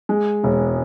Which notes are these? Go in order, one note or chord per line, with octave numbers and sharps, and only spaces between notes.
G#3
E1